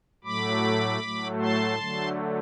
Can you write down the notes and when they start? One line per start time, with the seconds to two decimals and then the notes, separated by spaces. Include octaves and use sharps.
0.24 A2 F#3 A3 B5 D6
1.01 A2 F#3 A3
1.39 A5 C6
1.78 D3 F#3 A3